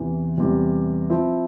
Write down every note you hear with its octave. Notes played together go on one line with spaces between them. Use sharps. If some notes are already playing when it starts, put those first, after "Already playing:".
Already playing: E2 C3 E3
E2 C3 G3
F3 C4 E4